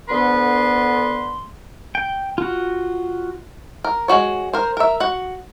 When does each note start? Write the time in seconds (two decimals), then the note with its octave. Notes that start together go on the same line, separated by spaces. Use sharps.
0.10 D2 D3 B3 A4 B4 C6
1.95 G5
2.38 F4 F#4
3.84 A#4
4.08 G#3 A3 F#4 C#5
4.53 A#4 C5
4.77 A#4 E5
5.00 F#4 F#5